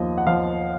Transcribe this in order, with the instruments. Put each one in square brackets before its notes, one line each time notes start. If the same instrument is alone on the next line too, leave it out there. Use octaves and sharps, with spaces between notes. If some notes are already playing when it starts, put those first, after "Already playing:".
Already playing: [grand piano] D#2 F3 D#5
F#5
F3 F5